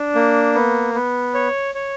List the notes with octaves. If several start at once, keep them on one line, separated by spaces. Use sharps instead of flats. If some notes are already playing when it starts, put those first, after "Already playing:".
Already playing: D4
A#3
B3
B3
C#5
C#5